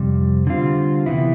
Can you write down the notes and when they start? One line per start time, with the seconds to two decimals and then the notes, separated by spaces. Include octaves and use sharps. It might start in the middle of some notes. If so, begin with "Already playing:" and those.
Already playing: F2 C3 G3
0.47 D3 G3 C4 F4
1.06 C3 E3 B3 E4